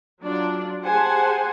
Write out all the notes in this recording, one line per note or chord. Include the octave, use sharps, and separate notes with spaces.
F#3 D4 F4 D5
G4 G#4 C5 F#5 G#5 A5